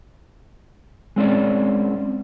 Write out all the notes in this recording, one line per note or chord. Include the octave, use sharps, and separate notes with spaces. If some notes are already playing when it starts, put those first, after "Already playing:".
G#3 C4 C#4 D5